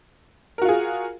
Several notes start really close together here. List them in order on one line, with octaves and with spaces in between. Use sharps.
A#4 F#4 F4 G#4